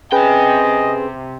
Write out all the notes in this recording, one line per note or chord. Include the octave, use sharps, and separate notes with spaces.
C3 C#4 G#4 B4 D#5 G5 G#5